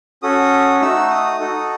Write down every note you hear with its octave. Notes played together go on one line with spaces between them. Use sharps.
C#4 F#4 A4 D#6
A3 D#4 F#4 E6
D#6
D#4 F#4 A4